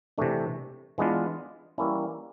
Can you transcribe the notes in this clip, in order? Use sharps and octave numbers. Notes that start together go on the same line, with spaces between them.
C3 E3 A3 D4
E3 G#3 B3 D4 F4
E3 G3 A#3 C#4 E4